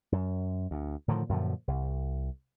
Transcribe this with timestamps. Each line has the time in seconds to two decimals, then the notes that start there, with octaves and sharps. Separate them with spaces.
0.12 F#2
0.71 D2
1.08 A2 D3 D#3 F3
1.29 F#2 A#2 D3 F3
1.68 C2